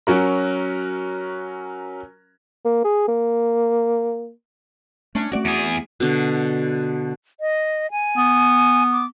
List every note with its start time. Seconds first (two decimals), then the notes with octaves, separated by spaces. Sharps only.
0.07 F#3 C#4 F#4 A#4
2.65 A#3
2.85 G#4
3.08 A#3
5.15 A3 C#4 D4
5.32 A3 C4 C#4 F#4 D5
5.45 E2 G#4
6.00 B2 D3
7.40 D#5
7.91 G#5
8.17 B3
8.92 D6